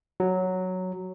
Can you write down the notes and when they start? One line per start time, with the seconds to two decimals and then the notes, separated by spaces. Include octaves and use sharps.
0.20 F#3